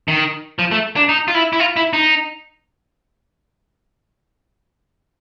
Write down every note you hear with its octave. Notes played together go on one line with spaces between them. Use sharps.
D#3
F3
A3
D4
D#4
F4
E4
E4
F4
E4
D#4